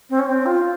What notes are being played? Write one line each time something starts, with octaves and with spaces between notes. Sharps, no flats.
C4
C#4
C4
F4